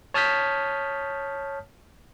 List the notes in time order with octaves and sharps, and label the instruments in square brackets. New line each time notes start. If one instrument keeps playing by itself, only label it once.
[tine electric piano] C#5 A5 D#6 F6 G6 B6